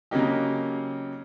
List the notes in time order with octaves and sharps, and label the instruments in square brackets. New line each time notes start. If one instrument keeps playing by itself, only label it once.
[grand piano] C#3 F#3 A#3 D#4 G4